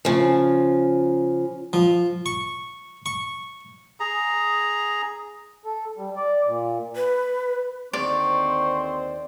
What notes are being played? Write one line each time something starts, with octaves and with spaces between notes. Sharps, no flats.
C#3 F3
F3
C#6
C#6
G#4 A#5
A4
G3
D5
A#2
B4
D#2 D3 C4 C5 D5 C#6